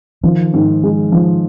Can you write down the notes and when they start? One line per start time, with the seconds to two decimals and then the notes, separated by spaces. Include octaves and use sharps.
0.23 D#3 F3
0.54 G#2
0.83 G#3
1.12 F3